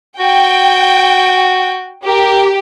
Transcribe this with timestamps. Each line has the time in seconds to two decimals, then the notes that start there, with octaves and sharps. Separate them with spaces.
0.19 F#4 G5
2.07 G4 A#4